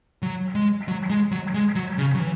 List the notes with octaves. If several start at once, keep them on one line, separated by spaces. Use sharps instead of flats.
F#3
G#3
F#3
G#3
F#3
G#3
F#3
C#3
F#3
E3